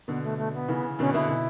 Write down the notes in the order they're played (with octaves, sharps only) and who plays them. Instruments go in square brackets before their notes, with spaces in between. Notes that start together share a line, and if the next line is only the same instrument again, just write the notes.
[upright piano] B2 D3 [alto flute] B3
[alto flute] A3
A3
B3
[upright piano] C#3 E3
[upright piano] B2 D3 [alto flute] C#4
[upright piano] B2 D3 [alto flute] E4
[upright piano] B2